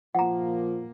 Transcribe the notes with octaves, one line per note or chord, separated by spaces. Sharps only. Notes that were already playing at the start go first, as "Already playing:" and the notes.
A#2 F3 A#3 F#5 A#5